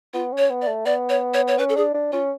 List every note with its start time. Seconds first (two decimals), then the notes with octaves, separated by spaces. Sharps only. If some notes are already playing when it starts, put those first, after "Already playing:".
0.13 B3 F4
0.32 C#4
0.37 C#5
0.50 B3
0.61 D5
0.67 A3
0.86 B3 D5
1.09 C#5
1.34 C#5
1.48 C#5
1.58 C#4 B4
1.69 A4
1.76 D4 G#4
1.94 D4
2.12 C#4 F4